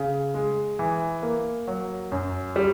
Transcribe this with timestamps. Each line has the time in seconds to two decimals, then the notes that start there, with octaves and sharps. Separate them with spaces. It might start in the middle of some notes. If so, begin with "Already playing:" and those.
Already playing: C#3
0.34 G#3
0.79 E3
1.23 A#3
1.68 F#3
2.12 F#2
2.56 G3